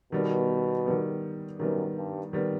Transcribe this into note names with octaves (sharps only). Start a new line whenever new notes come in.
B2 D#3 G3 B3
D#3 G3 B3
F#2 D#3 G3 B3
G2
D#3 G3 B3